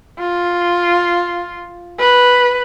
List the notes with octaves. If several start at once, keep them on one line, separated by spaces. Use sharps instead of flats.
F4
B4